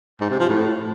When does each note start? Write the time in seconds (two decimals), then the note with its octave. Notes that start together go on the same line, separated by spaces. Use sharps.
0.20 G#2
0.30 C3
0.39 F3
0.49 A2